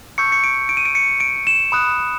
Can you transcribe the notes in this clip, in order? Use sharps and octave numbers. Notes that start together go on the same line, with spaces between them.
A5 C#6 E6 G6 C#7
C#7
D7
D7
D#7
D7
C#7
D7
E7
B5 D#6 F#6